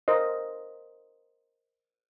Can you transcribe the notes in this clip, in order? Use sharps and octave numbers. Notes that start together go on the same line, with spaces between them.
A#4 C5 D#5